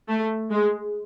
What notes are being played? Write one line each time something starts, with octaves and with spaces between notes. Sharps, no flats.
A3
G#3